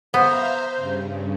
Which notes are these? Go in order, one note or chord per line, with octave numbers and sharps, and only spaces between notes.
B3 C5 E5 F5 A#5
G2 C#3